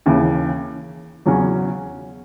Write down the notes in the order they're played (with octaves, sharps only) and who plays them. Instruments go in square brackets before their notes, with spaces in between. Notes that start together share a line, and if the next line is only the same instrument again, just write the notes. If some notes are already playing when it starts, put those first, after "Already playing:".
[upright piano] D#2 C#3 E3
E2 C#3 F#3 C#4